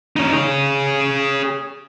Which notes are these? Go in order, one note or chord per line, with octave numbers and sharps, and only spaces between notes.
C#4 D#4
G#4 C#5